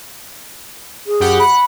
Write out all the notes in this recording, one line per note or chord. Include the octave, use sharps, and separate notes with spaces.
G#4
F#2 G4 F#5
F#5 B5